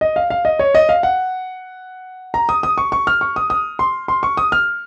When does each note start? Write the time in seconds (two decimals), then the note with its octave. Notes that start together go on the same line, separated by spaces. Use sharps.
0.01 D#5
0.16 F5
0.30 F5
0.45 D#5
0.59 C#5
0.75 D#5
0.89 F5
1.03 F#5
2.34 A#5
2.49 D#6
2.63 D#6
2.78 C#6
2.92 C#6
3.07 F6
3.21 C#6
3.36 D#6
3.50 D#6
3.79 C6
4.08 C6
4.23 C#6
4.37 D#6
4.52 F6